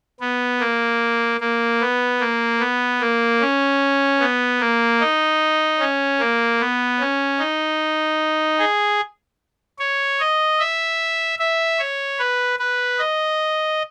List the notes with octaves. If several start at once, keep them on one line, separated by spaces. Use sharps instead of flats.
B3
A#3
A#3
B3
A#3
B3
A#3
C#4
B3
A#3
D#4
C#4
A#3
B3
C#4
D#4
G#4
C#5
D#5
E5
E5
C#5
B4
B4
D#5